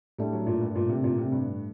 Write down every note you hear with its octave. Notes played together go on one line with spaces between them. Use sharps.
A2 G3 A3 D4
F#3
A#2
G2
A#2
C3
A#2
C3
G2